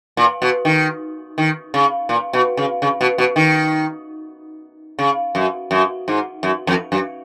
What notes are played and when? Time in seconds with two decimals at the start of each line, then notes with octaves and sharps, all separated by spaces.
0.17 A#2
0.42 B2
0.65 D#3
1.38 D#3
1.74 C#3
2.09 A#2
2.33 B2
2.57 C#3
2.82 C#3
3.01 B2
3.18 B2
3.36 D#3
4.99 C#3
5.35 F#2
5.71 F#2
6.08 G#2
6.43 F#2
6.67 F2
6.92 F#2